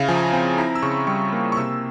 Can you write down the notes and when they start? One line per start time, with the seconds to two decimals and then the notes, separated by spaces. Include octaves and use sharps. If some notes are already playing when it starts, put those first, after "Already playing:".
Already playing: C#3 E4 F5
0.08 F3 G#5
0.16 A#5
0.23 G#5
0.33 C4 G#5
0.58 E4 A#5
0.75 E6
0.82 C#3 C#6
1.07 G3 C#6
1.33 A#3
1.52 C#6
1.57 C3 E6